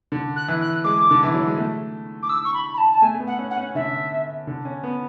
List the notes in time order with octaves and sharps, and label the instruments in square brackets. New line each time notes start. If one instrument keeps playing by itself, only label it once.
[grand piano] D3
[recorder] F#6
[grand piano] E3
[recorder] F#6
[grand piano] G#3 [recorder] D6
[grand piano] D3
E3
F#3
G#3
A3
[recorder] D6
E6
C#6
B5
B5
A5
A5
[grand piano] A3 [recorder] G#5
[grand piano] A3
B3
[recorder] F#5
[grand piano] C#4
[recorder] F#5
[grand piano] C#4
[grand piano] D3 [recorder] E5
[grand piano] D3
C#4
B3